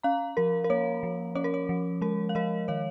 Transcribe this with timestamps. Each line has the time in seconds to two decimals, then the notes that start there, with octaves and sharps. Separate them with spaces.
0.03 C#4 F5 A#5
0.37 F3 A#4
0.64 A#4
0.70 A#3 C#5
1.03 F3
1.35 C#4 C#5
1.44 A#4
1.54 C#5
1.69 F3
2.01 G#3 A#4
2.29 F5
2.35 F3 A#4 D#5
2.68 D#3 C#5 F5